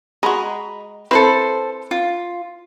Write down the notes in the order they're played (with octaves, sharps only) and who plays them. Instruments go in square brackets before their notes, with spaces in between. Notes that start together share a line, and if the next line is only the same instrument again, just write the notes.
[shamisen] G#3 F#4 [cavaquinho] D#5 A#5 B5
[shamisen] C4 E4 B4 [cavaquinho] A4 C5 C6
[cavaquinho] F4